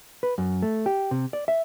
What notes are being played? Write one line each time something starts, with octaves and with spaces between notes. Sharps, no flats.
B4
F#2
A3
G4
C3
D5
E5